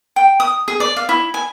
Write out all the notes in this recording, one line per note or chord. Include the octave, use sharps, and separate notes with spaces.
G5
D#6
G#4
D5
F5
E4
G#5